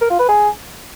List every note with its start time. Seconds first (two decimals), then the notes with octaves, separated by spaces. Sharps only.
0.01 A#4
0.10 F4
0.19 B4
0.28 G#4